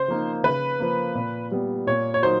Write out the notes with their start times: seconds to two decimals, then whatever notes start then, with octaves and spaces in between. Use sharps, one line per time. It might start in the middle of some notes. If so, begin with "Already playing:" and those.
Already playing: C#3 C5
0.08 F3 A#3 D#4
0.44 C#3 B4
0.80 F3 A#3
1.15 A#2
1.51 G3 B3
1.87 A#2 C#5
2.14 C#5
2.22 F#3 A#3 D#4 C5